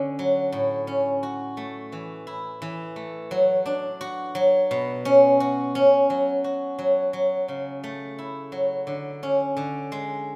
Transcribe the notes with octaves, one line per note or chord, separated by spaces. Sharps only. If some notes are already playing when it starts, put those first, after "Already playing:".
Already playing: D3 C#4
F#3
A2
C#4
F#4
A3
E3
E4
E3
A3
F#3
D4
F#4
F#3
B2
C#4
F#4
C#4
F#3
F#4
F#3
F#3
C#3
A3
E4
F#3
D3
C#4
D3
G#3